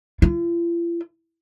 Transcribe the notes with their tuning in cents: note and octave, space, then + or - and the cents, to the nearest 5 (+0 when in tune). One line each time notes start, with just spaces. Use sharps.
F4 -45